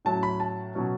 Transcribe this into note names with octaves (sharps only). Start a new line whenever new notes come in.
A2 F#3 C#4 A5
B5
A5
B2 F#3 C#4